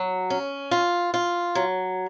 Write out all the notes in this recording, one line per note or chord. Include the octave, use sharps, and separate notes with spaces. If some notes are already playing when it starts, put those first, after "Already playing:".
Already playing: F#3
C#4
F4
F4
F#3